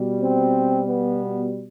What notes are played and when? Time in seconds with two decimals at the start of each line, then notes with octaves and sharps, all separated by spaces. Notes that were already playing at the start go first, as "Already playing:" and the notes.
Already playing: B2 G3
0.22 C4
0.87 B3